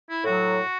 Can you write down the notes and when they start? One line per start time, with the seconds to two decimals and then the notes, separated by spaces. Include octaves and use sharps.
0.09 E4
0.23 A2 F#3 F#4